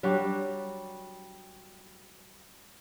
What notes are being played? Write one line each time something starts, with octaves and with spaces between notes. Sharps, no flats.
F#3 G3 D4 F#4